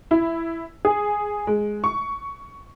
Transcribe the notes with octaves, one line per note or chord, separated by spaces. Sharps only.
E4
G#4
G#3
C#6